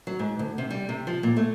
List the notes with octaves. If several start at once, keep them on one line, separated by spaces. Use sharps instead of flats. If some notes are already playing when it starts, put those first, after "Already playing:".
F#3
G#2
D2
C3
G3
C3
F3
A#2
A3